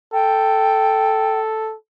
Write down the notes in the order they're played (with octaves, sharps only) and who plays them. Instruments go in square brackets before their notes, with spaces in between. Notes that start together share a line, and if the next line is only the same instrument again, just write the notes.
[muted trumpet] A4 [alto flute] G5